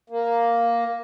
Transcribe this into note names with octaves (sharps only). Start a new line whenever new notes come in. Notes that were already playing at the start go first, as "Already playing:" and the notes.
A#3